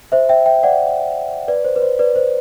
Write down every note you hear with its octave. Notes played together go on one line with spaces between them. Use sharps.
C5 E5
E5 G5
E5 G5
D5 F#5
B4 D5
C5
B4
C5
B4 D5
C5